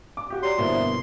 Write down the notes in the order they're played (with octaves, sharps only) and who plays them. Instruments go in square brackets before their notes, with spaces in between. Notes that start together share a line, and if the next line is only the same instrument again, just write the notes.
[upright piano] D6
F#4 G4
[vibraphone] C#5 D5 A#5 [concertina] C6
[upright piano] G1 B2 A#3 [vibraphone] E4 C5 E5
[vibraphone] B3